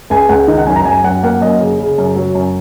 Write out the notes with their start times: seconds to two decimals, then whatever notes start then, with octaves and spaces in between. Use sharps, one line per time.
0.10 C#2 G#5
0.29 C#2 F#5
0.48 D#3 D#5
0.57 F#5
0.66 F#2 G#5
0.76 A#5
0.85 F#2 G#5
1.04 F#2 F#5
1.23 A#3 F#5
1.41 F#2 D#5
1.61 C#3
1.80 C#3
1.98 F#2
2.16 F#3
2.35 F#2